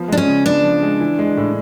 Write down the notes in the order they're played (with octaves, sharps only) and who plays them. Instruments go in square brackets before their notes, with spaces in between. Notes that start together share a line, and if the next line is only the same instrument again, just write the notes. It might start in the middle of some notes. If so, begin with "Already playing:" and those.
Already playing: [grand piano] F3 B3
[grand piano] G#3 [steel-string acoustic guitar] D4
[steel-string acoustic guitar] C#4
[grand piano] C#3
[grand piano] B3 [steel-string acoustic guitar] D4
[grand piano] F3
G#3
E3
G#3
A2